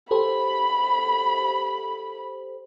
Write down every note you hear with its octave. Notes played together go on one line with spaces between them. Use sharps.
G4 A4 C5 B5